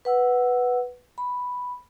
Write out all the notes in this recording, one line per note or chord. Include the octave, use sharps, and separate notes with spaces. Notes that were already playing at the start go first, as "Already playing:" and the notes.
B4 F#5 E6
B5